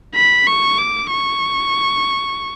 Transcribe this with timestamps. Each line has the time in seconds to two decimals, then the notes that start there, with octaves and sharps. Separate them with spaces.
0.15 B5
0.47 C#6
0.78 D6
1.10 C#6